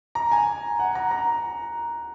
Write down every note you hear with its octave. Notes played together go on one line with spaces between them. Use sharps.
A#5
G#5
F#5
A#5
A#5